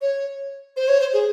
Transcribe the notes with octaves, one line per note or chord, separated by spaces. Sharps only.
C#5
C5
C#5
C5
G#4